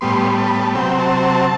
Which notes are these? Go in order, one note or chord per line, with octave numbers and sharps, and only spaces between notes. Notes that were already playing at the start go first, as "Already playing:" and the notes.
A2 G3 B3 C6
A5
B5
A5
C3 F#3 C4 G5
A5
A5